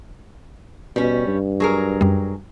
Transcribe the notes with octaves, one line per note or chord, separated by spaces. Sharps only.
B2 G3 C#4
G2
F#3 G#4 A#4
F#2 G3